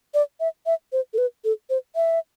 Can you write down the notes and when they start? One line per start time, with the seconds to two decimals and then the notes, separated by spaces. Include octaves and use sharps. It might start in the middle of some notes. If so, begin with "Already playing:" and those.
0.14 D5
0.40 E5
0.66 E5
0.92 C5
1.14 A4
1.18 B4
1.44 A4
1.70 C5
1.96 E5